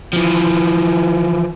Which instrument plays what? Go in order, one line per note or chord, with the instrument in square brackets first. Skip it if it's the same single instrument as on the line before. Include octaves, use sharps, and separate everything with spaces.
[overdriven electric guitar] E3 F3